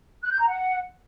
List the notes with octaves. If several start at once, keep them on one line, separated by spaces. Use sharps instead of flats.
F#6
G6
A#5
F#5